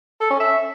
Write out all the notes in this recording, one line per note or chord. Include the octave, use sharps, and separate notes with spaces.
A4
C#4
E5